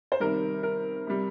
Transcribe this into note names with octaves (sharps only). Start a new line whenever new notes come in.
C5
C3 D#3 G3 A#4
A#4
C3 G3